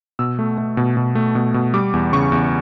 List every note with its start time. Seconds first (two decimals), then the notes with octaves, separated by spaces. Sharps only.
0.19 B2 E6
0.39 A3
0.58 A3
0.77 B2
0.97 B2
1.15 A3
1.35 B2
1.54 B2
1.74 G3 D6
1.93 E2
2.13 C#3 C#6
2.32 E2